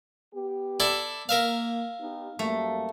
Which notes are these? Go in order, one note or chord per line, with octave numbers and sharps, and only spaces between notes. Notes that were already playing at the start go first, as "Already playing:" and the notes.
B3 G4
E4 A4 D5
A#3 A#4 E5 F5
B3 D#4 G4
F#2 G3 A3 A#3